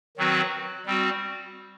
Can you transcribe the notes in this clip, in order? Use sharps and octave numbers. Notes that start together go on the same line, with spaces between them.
D#3 F#3 C4 F#4 B4
G3 C4 F#4